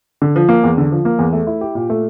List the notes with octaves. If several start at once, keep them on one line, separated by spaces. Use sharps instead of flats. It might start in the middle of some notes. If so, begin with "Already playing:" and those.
D3
F3
A#3
E2
D3
F3
A#3
E2
A3
E4
G4
A#2
A3